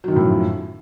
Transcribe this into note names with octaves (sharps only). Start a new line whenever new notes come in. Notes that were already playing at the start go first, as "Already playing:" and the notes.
F#2 A2 D#3 F3 F#3